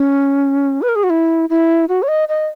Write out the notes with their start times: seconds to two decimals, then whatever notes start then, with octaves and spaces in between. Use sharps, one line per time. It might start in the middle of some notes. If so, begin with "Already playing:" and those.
Already playing: C#4
0.82 B4
0.89 A#4
0.96 G#4
1.03 F#4
1.10 E4
1.50 E4
1.89 F#4
2.03 C#5
2.08 D#5
2.28 D#5